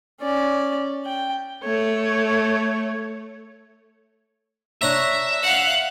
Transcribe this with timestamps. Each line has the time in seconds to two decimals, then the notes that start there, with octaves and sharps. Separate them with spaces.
0.21 C#4 D5
1.06 G5
1.65 A3 C#5
4.82 D4 C#5 E5 A#5
5.42 F5 F#5